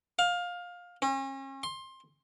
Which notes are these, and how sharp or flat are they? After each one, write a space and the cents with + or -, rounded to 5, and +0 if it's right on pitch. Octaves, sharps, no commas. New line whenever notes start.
F5 +20
C#4 -40
C6 +20